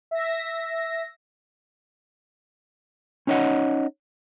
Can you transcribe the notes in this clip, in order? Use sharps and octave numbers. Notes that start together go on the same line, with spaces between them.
E5 A#6
C#4 D#4 C#5 D#5 F#5